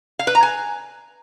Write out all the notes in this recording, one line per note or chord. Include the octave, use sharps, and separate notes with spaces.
F5
B4
A#5
G#5